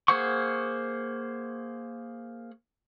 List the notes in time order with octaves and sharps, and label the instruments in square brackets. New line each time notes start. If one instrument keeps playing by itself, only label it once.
[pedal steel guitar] A#3 G#4 C5 F#5 C#6